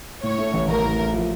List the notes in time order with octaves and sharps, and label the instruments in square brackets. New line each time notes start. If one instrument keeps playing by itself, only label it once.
[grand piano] A2 [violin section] C#5
[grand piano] A3
A1
[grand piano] A1 [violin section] A#4
[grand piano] A2
A3
F3